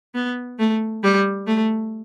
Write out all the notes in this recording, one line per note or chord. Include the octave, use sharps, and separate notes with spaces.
B3
A3
G3
A3